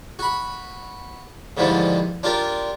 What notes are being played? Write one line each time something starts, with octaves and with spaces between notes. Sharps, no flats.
F#4 B5
G#2 D3 E3 F3 G3
D4 F4 G4 A#4